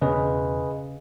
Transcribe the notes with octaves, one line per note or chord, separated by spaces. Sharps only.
E1 C#3 C#4 G#4 B4 D#5